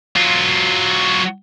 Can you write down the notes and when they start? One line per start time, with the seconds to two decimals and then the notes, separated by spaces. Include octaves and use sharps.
0.16 F#3 F4